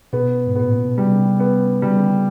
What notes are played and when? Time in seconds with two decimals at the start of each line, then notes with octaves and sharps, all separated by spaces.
0.13 B2 B3
0.47 G#2
0.55 A2 B3
0.72 A#2
0.85 B2
0.98 C3 G3
1.40 B3
1.82 C#3 G3
1.95 D3
2.08 C#3